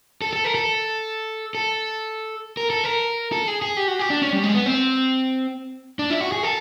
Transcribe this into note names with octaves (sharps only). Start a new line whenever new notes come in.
A4
A4
A#4
A4
A4
A#4
A4
A#4
A4
G#4
G#4
G4
F#4
G4
D4
C#4
G3
G#3
B3
C4
D4
E4
F#4
G#4
A4